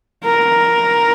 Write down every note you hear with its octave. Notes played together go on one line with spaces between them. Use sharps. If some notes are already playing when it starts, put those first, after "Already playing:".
A#4